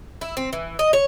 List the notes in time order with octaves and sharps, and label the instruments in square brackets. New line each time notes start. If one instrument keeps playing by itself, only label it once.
[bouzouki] E4
C4
E3
D#5
C#5